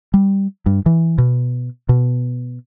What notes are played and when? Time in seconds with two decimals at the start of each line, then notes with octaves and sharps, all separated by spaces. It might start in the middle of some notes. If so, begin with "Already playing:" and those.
0.14 G3
0.66 G2
0.86 E3
1.18 B2
1.89 B2